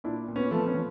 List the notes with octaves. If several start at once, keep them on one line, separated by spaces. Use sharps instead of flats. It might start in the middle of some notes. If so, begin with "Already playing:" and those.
A#2 D4 E4
A#2
B3 C#4
F3 A3 B3
B3 C#4
F3